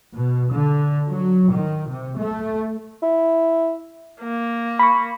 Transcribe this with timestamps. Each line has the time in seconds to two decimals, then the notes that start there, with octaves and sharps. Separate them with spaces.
0.16 B2
0.53 D3
1.09 F#3
1.52 D#3
1.88 C3
2.17 A3
3.03 E4
4.21 A#3
4.79 B5 C#6